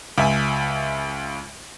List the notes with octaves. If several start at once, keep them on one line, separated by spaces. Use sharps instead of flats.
C#2 E5 G#5